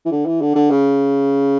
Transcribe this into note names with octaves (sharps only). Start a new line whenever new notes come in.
E3
D3
E3
D3
D3
C#3